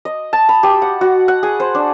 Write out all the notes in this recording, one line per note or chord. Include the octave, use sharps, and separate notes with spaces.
D#5
A5
B5
G4
F#5
F#4
F#5
G#4
C5
D4